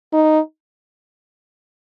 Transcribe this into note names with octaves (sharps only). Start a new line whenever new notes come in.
D#4